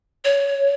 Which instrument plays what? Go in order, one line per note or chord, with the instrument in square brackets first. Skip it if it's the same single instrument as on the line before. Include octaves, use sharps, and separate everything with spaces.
[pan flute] C#5